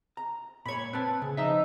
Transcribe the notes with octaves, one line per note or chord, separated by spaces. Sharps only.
A#5
A#2 C#5 B5 G#6
C4 B4 A5
C#3
F3 D#4 E5